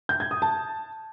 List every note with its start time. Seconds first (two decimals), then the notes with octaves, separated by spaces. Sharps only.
0.09 G6
0.20 G#6
0.31 D#6
0.42 A5